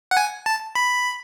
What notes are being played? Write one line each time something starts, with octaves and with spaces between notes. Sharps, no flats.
F#5
G#5
A5
B5